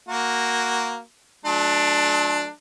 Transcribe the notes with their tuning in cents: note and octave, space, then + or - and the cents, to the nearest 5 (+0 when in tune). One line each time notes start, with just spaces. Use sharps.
A#3 +0 F#4 -5
F#3 -40 A3 -40 D4 +10